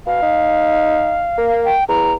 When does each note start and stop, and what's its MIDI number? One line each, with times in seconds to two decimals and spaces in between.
0.06 0.21 47
0.06 1.63 77
0.22 1.29 63
1.38 1.74 58
1.65 1.84 79
1.88 2.13 40
1.88 2.13 82